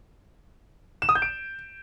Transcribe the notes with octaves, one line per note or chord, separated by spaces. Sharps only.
E7
D#6
G6
D7